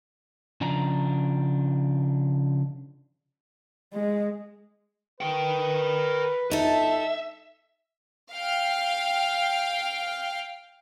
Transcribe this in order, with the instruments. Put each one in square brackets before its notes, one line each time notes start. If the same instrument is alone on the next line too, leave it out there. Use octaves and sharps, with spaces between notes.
[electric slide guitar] C#3 F3 D4 A#5
[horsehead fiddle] G#3
[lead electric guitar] A#4 G5 [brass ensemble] B4
[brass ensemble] G1 A5 [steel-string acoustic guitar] D#4 A4 [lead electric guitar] E5
[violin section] F5 G5